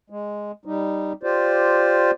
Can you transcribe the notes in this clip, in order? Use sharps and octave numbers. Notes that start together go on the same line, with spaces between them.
G#3
G3 D#4
F4 G4 C5 D5